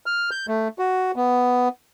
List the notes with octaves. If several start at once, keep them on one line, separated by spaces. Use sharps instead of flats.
F6
G6
A3
F#4
B3